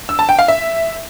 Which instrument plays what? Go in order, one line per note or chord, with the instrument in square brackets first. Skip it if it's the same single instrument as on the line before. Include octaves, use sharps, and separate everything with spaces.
[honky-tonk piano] E6
A5
G5
F5
E5